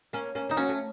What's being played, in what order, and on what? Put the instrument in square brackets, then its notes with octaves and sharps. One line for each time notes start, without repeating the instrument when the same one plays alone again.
[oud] A#3 C#4
A#3 C#4
[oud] C4 [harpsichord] D#4
[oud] F#3 A#3 [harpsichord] C#4
[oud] A3